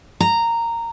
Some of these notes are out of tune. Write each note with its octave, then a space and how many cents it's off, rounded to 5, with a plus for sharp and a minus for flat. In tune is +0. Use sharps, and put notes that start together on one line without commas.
A#5 -10